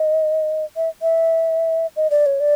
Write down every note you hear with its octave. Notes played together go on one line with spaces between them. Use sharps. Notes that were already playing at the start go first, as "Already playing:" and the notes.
Already playing: D#5
E5
E5
D#5
D5
C#5
D5